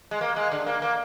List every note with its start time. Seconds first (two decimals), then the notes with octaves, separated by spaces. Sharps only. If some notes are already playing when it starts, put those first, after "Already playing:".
0.11 G#3
0.21 A#3
0.36 G#3
0.51 D3
0.66 A#3
0.82 A#3